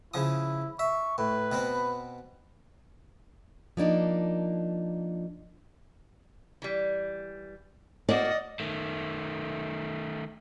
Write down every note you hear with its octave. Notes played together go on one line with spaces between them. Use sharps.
C#3 F3 E4 D#6
E5 C#6
A2 B4
B2 B3 C4
F3 A#3 D4 D#4
E3 G3
A2 A#3 F#4 D5 D#5
D#3 A3